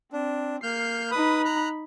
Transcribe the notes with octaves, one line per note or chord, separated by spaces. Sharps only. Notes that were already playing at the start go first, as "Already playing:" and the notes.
C4 D4
A#3 F6 G6 C7
D#4 B4 B5 D#6
A#5 F#6